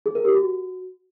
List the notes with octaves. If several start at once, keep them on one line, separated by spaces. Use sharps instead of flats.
G#4
A#4
G4
F#4